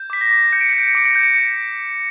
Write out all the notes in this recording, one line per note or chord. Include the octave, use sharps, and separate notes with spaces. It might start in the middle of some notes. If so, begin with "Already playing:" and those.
Already playing: G6
D6 B6
A#6
D6
G6 C#7
D7
G6 C#7
D7
C#7
D6 D7
C#7
G6 D7
C#7